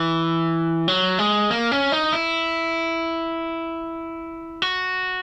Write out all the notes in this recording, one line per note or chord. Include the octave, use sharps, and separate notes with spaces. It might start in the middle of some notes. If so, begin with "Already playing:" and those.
Already playing: E3
F#3
G#3
A#3
C#4
D#4
E4
F#4